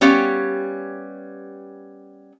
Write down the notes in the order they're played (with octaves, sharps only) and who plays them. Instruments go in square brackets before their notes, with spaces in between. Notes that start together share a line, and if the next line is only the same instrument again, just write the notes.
[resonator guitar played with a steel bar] G3 B3 C#4 G4 C#5 F5